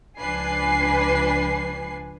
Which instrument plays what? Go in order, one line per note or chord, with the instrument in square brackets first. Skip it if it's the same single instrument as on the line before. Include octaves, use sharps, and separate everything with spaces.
[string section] C#2 F3 D4 B4 G#5 C7